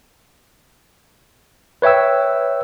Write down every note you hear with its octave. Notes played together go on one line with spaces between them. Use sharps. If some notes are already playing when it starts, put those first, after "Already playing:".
B4 C#5 E5 G5 E6